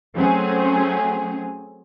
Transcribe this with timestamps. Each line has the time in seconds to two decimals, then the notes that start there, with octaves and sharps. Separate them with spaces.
0.14 F#3 A3 C4 C#4 G#4